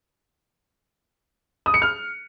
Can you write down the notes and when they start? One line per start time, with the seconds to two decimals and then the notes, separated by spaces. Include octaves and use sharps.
1.66 D#6
1.74 C#7
1.82 F6